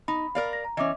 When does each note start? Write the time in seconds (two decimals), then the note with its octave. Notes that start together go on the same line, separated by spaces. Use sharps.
0.08 D#4 B5
0.35 A#4 D5 F5
0.53 A#6
0.64 A#5
0.77 E3 C#4 D#5 E5 D6